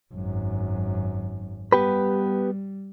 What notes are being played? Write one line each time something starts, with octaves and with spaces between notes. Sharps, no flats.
G#1 F#2
G3 B3 G4 B4